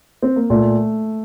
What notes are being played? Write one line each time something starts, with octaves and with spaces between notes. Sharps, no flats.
C4
A#3
A#2 A3